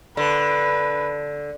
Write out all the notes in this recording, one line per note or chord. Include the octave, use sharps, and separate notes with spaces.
D3 B4